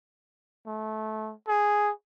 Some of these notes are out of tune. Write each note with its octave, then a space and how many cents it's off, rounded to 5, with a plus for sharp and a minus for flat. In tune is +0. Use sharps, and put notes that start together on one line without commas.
A3 -20
G#4 +0